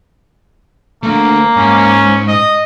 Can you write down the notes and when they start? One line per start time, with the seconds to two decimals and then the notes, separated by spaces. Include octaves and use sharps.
1.03 A3 A#3 D4
1.57 G#2 C#4
2.28 D#5